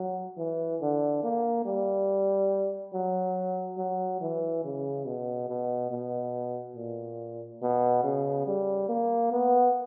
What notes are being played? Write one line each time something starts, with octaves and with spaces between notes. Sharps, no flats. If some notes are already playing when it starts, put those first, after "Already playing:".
Already playing: F#3
E3
D3
A#3
G3
F#3
F#3
E3
C#3
B2
B2
B2
A#2
B2
C#3
G3
A#3
B3